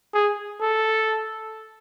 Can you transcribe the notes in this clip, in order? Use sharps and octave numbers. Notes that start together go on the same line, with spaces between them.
G#4
A4